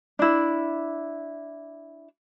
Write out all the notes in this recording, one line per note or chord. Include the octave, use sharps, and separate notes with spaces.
D4 E4